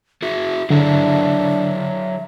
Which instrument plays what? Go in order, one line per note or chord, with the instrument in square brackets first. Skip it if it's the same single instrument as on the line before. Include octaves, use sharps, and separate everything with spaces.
[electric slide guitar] F#4 G#4 [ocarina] E5
[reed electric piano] D3 [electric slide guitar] F#3 E4 G#4 [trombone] D4